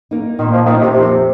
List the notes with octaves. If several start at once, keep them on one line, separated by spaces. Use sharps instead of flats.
A#3 D#4
A#2 D#3
F3
D#3 A#3 D#4
C3
F2 C3